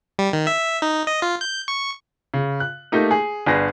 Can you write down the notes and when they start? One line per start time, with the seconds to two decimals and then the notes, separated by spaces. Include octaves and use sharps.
0.19 G3
0.33 D#3
0.47 E5
0.82 D#4
1.07 D#5
1.22 F4
1.41 G6
1.68 C#6
2.34 C#3
2.60 F#6
2.92 A3 A#3 D#4 G4
3.11 G#4
3.46 G1 D4 G#4 B4 A#6